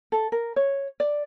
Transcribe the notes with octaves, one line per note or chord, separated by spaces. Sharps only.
A4
A#4
C#5
D5